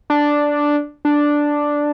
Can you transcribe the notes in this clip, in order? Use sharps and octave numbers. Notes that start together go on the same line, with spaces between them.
D4
D4